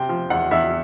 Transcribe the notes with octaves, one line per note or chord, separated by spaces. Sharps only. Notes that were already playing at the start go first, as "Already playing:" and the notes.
Already playing: C3 G5
F3
E2 F#5
E2 E5